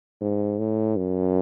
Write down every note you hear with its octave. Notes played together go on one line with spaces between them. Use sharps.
G#2
A2
F#2